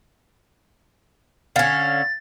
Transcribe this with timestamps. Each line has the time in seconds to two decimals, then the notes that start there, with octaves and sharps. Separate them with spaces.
1.56 D3 C#4 F5 A6